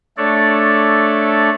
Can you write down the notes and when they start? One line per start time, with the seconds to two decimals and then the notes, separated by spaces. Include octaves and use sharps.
0.17 A3 D4 A4 C#5 D5